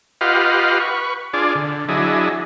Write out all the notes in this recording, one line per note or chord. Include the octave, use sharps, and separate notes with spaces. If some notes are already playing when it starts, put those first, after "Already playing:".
F4 G4 B4 D#5 F5 F#5
B4 C#6
D4 F4 G#4 D5
D3
F#3 D4 E4 G#4 D#5